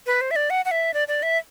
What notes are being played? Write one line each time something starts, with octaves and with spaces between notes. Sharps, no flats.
B4
C5
E5
D5
F#5
F#5
E5
D5
D5
E5